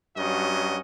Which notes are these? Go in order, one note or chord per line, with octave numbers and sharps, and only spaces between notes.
G2 F#3 C#4 F#4 D#5